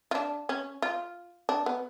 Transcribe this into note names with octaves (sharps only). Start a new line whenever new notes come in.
F4
D4
C#4
F4
D4
B3